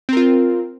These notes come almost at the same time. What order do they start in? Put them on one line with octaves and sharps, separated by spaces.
C4 A#4 F4